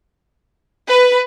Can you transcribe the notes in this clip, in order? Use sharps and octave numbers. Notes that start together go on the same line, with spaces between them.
B4